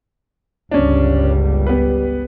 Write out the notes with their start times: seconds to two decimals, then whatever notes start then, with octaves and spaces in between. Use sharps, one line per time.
0.71 G1 C#2 G3 C#4 D4
1.67 B3 G4 B4